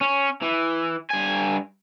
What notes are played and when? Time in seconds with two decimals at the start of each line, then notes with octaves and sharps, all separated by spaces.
0.01 C#4
0.42 E3
1.11 G2 G#5